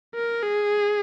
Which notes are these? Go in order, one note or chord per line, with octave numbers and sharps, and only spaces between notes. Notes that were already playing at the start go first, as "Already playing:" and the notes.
A#4
G#4